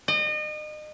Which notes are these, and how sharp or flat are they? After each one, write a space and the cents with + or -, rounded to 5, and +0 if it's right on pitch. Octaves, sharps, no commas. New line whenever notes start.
D#5 -35